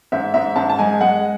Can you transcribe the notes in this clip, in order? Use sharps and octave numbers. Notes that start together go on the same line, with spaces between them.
G#2 E5
G#2 E5
G#2 A5
A5
G#3 G#5
G#3 F#5